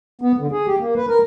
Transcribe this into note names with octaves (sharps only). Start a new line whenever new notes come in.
B3
D3
G#4
G4
A#3
B4
A#4